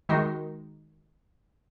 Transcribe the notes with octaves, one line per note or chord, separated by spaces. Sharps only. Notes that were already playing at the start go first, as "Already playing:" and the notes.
D#3 G#3 D#4 F#4